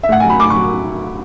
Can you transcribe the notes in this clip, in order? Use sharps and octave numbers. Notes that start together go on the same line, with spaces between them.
E5
A2 F#5
G#5
F#3
B5
A2 D6
C#6
F#3